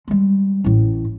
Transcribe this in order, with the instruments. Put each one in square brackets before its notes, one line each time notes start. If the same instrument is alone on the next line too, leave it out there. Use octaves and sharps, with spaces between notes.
[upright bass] G3 G#3
A1 A2